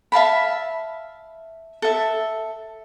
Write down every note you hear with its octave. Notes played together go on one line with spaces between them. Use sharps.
E5 F5 A5 B5
A4 E5